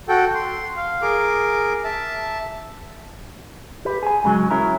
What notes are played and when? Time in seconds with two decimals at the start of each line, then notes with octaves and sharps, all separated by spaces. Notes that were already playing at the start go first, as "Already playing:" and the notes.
0.09 F#4 A4 G5
0.35 C6
0.76 F5
1.02 G#4 A#4 D6
1.84 E5 A5
3.85 G4 B4
4.03 G#4 G#5
4.24 G#2 C#3 F#3 G#3
4.51 F#3 C#4 E4 A#4